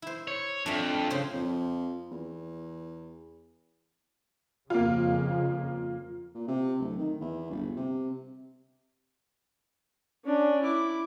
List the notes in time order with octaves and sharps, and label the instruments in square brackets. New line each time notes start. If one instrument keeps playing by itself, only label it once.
[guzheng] E4 C5
[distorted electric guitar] C#5
[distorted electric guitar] F2 [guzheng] A3 D4
[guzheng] C#3 C5 C#5
[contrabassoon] F2
E2
[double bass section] F2 C#3 [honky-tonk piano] A#3 F4
[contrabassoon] A#2
C3
D1
D#3
E2
G1
C3
[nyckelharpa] C#4 D4
E4 D6